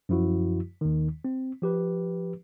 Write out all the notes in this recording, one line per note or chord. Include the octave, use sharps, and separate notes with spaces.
F#2 F3 E4 F#4
D#2 D#3
C4
F3 G4 B4